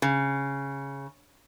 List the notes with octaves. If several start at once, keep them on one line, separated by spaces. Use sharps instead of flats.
C#3